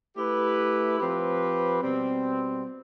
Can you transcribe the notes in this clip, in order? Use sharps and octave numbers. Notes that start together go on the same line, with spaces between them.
A3 E4 G4 B4
F3 C4 G4 B4
B2 G3 C4